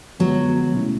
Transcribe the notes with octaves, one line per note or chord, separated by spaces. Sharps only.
D3 F#3 G#3 B3
B2 F#3 A3 C#4 E4